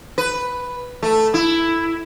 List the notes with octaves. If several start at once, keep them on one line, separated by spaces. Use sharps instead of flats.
B4
A3
E4